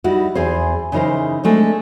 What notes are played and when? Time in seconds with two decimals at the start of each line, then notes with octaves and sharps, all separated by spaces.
0.04 G3 D#4 E4 F#4
0.35 E2 G#4 C5
0.92 C#3 E3 D#4 A#4 C5
1.44 G#3 A3 C4 D4